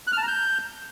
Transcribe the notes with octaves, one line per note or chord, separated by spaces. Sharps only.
F#6
F6
A5
A#5
G6